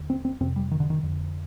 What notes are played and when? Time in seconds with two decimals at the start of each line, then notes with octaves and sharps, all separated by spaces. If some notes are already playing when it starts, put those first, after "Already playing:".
Already playing: D#2 D3
0.10 C4
0.25 C4
0.41 F2 C3 C4
0.56 G3
0.71 D#3
0.80 D3
0.90 D#3
1.03 F2 D3